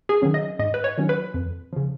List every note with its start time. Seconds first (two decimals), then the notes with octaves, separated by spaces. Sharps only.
0.09 G#4
0.22 D#3 F#3 C#4
0.34 D#5
0.59 G#2 D#5
0.74 B4
0.84 C#5
0.98 D#3 F#3 C#4
1.09 B4
1.34 F2
1.73 C#3 F3